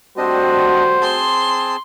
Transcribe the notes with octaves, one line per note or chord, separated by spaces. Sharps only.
G3 A3 C4 D4 F#4 C5 D#5
C4 G#4 A5 C6